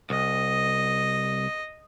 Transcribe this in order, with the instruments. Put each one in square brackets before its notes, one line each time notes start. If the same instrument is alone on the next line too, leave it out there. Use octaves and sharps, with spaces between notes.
[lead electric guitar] C2 [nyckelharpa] D#5